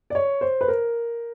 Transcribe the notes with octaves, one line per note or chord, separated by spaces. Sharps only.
D5
C#5
C5
B4
A#4